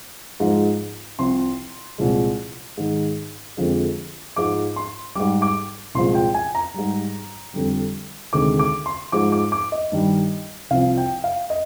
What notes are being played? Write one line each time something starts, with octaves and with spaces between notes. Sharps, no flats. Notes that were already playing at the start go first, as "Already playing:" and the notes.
G#2 F3 G#3
C2 C3 F3 C6
C2 A#2 F3 G#3
G#2 D#3 G#3
F2 D3 F3 G#3
G#2 F3 G#3 D6
C6
G#2 G3 D6
D6
C2 A#2 F3 G#3 C6
G5
G#5
A#5
G#2 G3
F2 D3 G3
D2 C3 D#3 G#3 D6
D6
C6
G#2 F3 G#3 D6
D6
D6
D#5
G2 D#3 G3
C2 C3 F3 F5
G5
F5
D#5